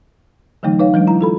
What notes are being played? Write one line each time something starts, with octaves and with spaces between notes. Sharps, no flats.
D3 E3 F#3 A3 D#4
D#4 B4 C#5 F5
E3 F#3 G#3 D4
E4 A#5
F4 A4 B5